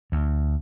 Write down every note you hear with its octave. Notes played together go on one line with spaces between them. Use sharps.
D2